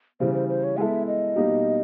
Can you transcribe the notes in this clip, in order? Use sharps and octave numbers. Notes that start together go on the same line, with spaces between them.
C#3 E3 G3 C5
C5
C5
C#5
G#3 B3 E4 A4 E5 G#5
D#5
B2 G3 A#3 D#4 G4